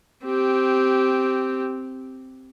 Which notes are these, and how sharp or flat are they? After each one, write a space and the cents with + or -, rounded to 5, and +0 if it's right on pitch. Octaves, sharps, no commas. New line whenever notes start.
C4 +0 G4 -10